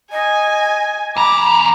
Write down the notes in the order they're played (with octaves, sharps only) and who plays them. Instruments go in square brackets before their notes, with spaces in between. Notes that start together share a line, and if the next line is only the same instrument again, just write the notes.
[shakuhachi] D#5 [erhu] G#5
[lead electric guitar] E2 A#5 [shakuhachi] B5 [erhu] D6